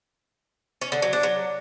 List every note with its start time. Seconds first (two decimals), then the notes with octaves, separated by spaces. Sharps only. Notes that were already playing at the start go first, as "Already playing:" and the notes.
0.81 C#4
0.92 D3
1.02 F#3
1.13 D4
1.23 F#3